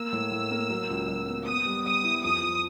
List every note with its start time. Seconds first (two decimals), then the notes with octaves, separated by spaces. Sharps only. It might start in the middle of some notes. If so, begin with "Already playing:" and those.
Already playing: A#3 E6
0.13 A2
0.32 A2
0.51 A#3
0.70 F#3
0.89 C#2
1.08 F#3
1.27 B3
1.46 B3 D#6
1.66 G3
1.84 G3 D#6
2.04 E4
2.23 F2 D#6
2.42 F2